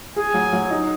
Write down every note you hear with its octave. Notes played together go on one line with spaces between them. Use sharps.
G#4 G#5
F#3
F#3
D#4